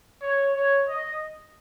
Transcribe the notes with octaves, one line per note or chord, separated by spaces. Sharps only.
C#5
C#5
D#5